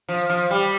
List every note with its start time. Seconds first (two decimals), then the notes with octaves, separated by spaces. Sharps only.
0.09 F3
0.30 F3
0.51 G3